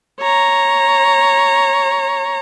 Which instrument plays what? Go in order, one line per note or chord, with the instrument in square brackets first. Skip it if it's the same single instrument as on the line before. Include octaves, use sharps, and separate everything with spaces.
[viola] C#5 A#5